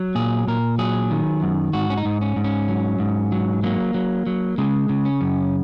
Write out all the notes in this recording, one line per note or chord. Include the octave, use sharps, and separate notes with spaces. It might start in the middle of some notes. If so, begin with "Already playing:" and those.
Already playing: F#3
A#2 G#4
A#2 A#4
F#3 G#4
D#3
F#2
G#2 F#4
C#4
D#4
G#2
C#4
G#2
C#4
F#3
G#2
F#3
F#3 A#3
F#3
F#3
C#3 G#3
C#3
C#4
F#2